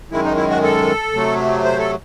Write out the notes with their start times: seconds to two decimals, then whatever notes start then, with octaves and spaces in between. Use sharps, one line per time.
0.11 F#2 D#3 G#3 E4
0.24 D#4
0.36 E4
0.50 F#4
0.63 A4
1.13 C3 F#3 A3
1.64 C5
1.78 A4